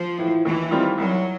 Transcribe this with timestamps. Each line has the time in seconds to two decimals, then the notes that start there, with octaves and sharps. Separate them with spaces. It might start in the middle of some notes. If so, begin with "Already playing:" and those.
Already playing: F3
0.18 A2 E3
0.45 D#2 E3
0.71 D#3 G3 C4 F4
0.98 C2 F#3